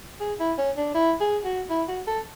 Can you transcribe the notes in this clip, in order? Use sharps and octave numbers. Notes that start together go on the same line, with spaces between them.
G#4
E4
C#4
D4
E4
G#4
F#4
E4
F#4
A4